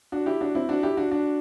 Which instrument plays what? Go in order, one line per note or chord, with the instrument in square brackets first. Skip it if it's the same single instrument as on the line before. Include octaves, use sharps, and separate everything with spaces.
[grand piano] D4 F#4
E4 G4
D4 F#4
C4 E4
D4 F#4
E4 G4
D4 F#4
D4 F#4